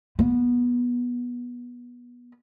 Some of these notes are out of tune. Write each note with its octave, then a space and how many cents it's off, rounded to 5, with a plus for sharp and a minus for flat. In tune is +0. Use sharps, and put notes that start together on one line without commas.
B3 -20